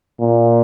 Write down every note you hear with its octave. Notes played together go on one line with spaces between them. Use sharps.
A#2